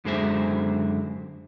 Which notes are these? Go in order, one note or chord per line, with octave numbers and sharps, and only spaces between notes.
F#2 D3 G#3 G#4 C5 E5